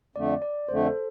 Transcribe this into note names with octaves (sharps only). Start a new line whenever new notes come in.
F2 D3 A3 D5
D5
F2 D3 A3 C5
A4